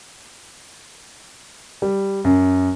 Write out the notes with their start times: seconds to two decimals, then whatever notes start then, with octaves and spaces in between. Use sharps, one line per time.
1.82 G3
2.24 F#2